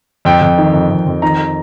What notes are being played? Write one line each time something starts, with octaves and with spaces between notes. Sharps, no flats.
F2 G5
F2
D#3
F2
F2
F2
D#3 A#5